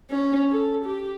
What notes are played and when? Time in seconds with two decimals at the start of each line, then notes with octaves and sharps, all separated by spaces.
0.10 C#4
0.51 A4
0.85 G4